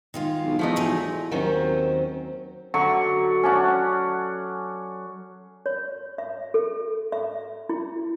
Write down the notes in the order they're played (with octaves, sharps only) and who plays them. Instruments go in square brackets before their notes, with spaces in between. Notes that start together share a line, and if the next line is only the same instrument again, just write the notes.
[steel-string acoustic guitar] D#3 G#3 F4
[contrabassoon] B1
[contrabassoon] E2 [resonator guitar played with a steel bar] F3 A3 D#4
[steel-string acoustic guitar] D2 F#3 G#5
D#2 D#3 F#3 C4 C#4 C5
[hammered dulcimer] D3 F#3 C#6
C#4 D4 F#5
[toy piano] C#5
E5
A4
E5
E4